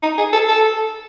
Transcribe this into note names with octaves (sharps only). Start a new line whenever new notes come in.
D#4
G#4
A4
A4